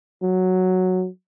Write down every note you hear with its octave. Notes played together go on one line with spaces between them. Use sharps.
F#3